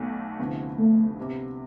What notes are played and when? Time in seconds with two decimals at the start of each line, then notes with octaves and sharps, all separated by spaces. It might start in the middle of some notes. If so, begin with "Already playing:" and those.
Already playing: B1 B2 A3
0.39 D2 C3 F3 B3 E4
0.79 A3
1.17 C3 G3 B3